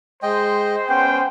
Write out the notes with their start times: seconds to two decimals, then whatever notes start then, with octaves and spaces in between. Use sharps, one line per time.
0.23 G#3 C5 D#5 G5
0.89 B3 C#4 G5